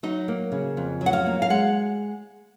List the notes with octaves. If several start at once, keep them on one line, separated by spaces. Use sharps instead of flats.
F#3 D#4
A#3
C#3
F2
F#3
F#5
F5
A#3
F5
G#3 F#5